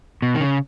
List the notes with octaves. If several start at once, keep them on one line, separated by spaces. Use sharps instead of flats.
B2
D#3
C#3